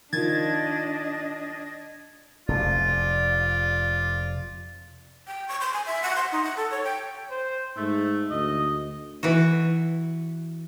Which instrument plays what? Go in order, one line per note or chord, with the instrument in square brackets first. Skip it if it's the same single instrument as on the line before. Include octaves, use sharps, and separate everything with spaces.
[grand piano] D#3 F3 [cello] D4 D#5 [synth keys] G#6 A6
[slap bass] F1 F2 [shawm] F4 [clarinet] D5
[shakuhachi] G5
C#6
C6
G#5
E5
F#5
C6
D#4
F#5
A4
C#5
G5
[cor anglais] C5
[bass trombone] G#2 [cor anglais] A3
[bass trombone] D2 [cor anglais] D#5
[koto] E3 F#4